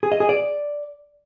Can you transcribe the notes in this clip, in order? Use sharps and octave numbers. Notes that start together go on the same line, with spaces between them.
G#4
D#5
G#4
D5